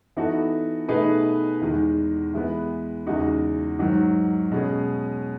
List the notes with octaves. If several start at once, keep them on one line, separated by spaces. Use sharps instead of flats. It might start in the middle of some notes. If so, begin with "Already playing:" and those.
E3 B3 D#4 F#4 A4
B2 A3 D#4 G#4 B4
E2 D#3 G#3
E3 G#3 B3
E2 C#3 G#3 D#4 F#4
G#2 D#3 F#3
B2 G#3 C#4 G#4